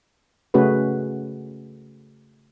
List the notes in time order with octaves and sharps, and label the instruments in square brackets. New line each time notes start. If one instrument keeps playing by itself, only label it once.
[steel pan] C#3 A3 C#4 F#4 G#4 B4